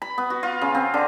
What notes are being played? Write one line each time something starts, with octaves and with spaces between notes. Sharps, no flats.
B5
B3
F#4
F4
C#3
C4
D3